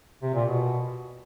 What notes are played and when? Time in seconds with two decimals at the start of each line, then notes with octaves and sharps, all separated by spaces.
0.22 C3
0.34 A#2
0.45 B2